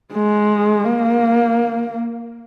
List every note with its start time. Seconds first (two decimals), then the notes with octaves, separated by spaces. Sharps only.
0.13 G#3
0.84 A#3